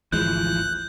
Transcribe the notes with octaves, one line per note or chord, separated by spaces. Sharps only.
G#1 D2 E3 F3 G#3 F#6 G6